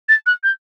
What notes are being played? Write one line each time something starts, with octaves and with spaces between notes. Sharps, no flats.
A6
F#6
G6